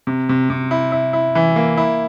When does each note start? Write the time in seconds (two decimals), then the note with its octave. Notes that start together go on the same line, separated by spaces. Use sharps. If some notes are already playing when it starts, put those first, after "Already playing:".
0.07 C3
0.29 C3
0.50 C3
0.71 E4
0.92 E4
1.13 E4
1.35 E3
1.56 A#3
1.77 E4